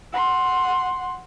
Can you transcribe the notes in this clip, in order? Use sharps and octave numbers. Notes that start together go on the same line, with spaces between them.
F#5 C6